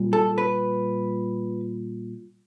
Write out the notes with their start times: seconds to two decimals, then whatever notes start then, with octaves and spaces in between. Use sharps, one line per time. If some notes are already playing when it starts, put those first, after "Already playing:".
Already playing: A#2 G3
0.13 A4
0.38 B4